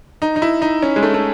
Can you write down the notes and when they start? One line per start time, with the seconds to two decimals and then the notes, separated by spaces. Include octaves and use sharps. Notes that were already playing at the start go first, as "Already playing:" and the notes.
0.22 D#4
0.36 D#4
0.42 E4
0.62 D#4
0.82 C#4
0.96 G#3
1.03 A3
1.14 A3